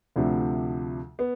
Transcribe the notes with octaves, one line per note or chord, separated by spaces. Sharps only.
D2 C3 F3 A3 D4
B3